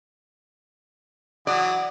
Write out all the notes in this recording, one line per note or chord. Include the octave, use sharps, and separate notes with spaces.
E3 F#3 D5 F#5 D#6